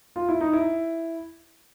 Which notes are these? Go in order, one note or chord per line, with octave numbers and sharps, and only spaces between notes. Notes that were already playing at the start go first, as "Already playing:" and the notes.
F4
E4
D#4
E4